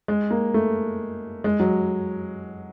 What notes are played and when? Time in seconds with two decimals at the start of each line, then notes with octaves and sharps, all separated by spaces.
0.08 G#3
0.31 A#3
0.54 A3
1.44 G#3
1.60 F#3